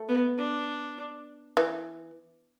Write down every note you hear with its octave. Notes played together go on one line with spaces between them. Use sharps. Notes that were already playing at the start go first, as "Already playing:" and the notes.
Already playing: A3
B3
D4
E3